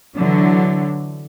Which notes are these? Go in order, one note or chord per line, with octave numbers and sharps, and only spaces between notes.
D3 E3 F#3